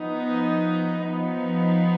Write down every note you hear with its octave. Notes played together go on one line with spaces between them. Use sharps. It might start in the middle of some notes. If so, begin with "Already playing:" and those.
Already playing: F3 B3 D#4
F3 B3 D#4